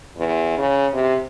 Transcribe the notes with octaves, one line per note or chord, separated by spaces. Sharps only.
E2
C#3
C3